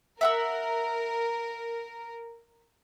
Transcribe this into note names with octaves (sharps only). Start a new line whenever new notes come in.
A#4 E5 F#5 E6